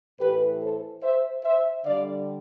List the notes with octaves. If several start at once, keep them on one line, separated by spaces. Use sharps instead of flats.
A2 E3 A3 G4 B4
A4 C5
C5 E5
C5 E5
D3 G3 D5 F5